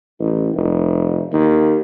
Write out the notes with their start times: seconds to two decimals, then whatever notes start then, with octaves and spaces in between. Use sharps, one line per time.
0.19 A1
0.54 F1
1.33 D#2